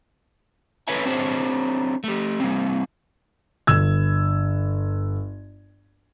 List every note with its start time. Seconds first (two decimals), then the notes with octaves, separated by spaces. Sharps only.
0.88 F#4 A4 B4 C#5 E5 G#5
1.05 C4 D4 F#4 G#4 C5 C#5
2.04 A3 G4
2.40 G3 G#3 A#3 C4
3.67 G1 E6 G#6